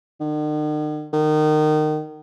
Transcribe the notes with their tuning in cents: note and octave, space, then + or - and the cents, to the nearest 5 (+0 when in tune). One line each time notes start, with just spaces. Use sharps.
D#3 -45
D#3 -25